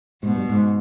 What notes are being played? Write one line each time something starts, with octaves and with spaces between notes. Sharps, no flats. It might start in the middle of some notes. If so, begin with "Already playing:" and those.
G#2 B2
G2
G#2